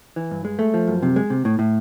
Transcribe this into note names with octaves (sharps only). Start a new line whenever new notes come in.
E3
G2
G#3
A3
F3
F#2
C3
G#3
C3
A2
A2